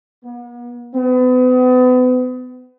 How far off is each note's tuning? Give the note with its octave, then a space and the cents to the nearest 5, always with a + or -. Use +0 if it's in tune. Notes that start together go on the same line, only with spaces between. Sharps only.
B3 -45
B3 +35